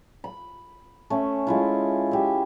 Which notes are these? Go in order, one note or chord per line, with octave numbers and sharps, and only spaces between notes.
B5
A3 C#4
G#3 E4 F4
G4 E5